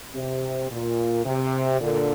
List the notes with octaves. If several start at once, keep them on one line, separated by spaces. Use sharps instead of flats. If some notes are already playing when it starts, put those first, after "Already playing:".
C3
A#2
C3
A#2 D3